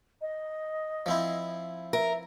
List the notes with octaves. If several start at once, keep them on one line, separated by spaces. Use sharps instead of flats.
D#5
F3 C4 E4
A#4 E5